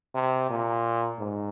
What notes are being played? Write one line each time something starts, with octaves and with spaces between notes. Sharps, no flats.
C3
A#2
G#2